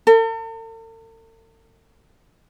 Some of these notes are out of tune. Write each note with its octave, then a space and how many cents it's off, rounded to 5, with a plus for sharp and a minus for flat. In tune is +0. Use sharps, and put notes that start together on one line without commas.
A4 +45